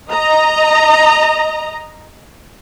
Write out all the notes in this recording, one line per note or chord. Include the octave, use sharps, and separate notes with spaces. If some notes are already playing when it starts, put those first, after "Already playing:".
D#5 A#5